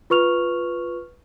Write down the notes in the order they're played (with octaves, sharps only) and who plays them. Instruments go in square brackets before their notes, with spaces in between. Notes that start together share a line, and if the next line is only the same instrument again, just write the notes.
[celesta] F4 B4 C#6 F6 F7